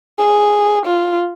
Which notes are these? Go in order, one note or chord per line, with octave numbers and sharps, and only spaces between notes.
G#4
F4